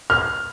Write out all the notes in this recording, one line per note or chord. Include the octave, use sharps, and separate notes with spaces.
F6